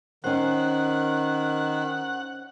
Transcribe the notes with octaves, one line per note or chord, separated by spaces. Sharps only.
D#3 C#4 C5 F#5